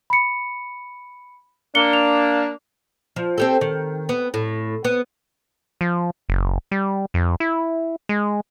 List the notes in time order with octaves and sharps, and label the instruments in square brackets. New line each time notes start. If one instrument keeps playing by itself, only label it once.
[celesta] B5 C#7
[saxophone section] A#3 D4 [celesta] C#7 G7
[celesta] F7
[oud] F3
C4 G4 A4
D#3
B3
A2
B3
[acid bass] F3
F#1
G3
F2
E4
G#3